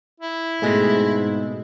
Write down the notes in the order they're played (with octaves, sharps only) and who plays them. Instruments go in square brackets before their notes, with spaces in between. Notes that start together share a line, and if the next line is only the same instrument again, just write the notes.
[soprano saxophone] E4
[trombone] G#2 [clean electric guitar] B2 G#3 C4 [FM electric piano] A3 G#4 D#5